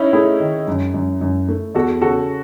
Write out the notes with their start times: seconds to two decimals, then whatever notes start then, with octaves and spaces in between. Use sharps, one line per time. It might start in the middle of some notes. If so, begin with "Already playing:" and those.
Already playing: C#4 D#4 E4
0.13 A3 E4 G#4
0.40 D#3
0.68 F#2
0.94 F#2
1.21 F#2
1.48 A3
1.75 E2 F#4 A4
2.01 C#3 F#4 A4